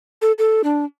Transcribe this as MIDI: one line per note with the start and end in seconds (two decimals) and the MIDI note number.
0.22 0.32 69
0.39 0.62 69
0.64 0.85 62